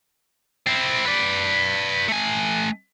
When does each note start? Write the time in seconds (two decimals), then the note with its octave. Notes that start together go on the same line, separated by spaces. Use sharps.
0.67 C4 E4
1.06 B4 D5
2.08 A3 G#5